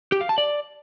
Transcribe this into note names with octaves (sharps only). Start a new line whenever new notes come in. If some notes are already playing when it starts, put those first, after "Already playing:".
G4
F5
A5
D5